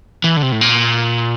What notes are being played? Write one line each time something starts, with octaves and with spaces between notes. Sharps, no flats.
E3
D3
C3
A2
A#2